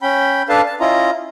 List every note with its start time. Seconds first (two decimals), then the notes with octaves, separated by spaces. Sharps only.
0.02 C#4 G5 B5
0.49 D4 A4 B4 F5 A5
0.66 A5
0.80 C#4 E4 F4 D#5 A#5